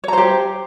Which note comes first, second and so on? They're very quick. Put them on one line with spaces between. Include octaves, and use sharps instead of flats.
C#5 A#5 C5 G4